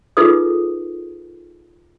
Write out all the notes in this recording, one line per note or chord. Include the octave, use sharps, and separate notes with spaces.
D#4 F4 G#4 A4 B4 D#6